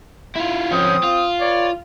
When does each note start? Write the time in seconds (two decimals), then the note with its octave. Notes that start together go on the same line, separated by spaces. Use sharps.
0.36 E4 F4
0.72 F3 C4 C#4 D#6
1.04 F4
1.40 B4 C#5 D5